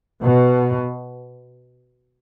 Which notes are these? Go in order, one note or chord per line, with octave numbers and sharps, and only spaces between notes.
B2